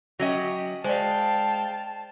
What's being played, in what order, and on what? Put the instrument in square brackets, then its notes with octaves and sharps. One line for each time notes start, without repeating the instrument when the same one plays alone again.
[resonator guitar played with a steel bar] F#3 C#4 D#5 [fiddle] G4 [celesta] A#6
[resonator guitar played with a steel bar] G#3 [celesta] C5 D5 [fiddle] F5 G5 [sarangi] A5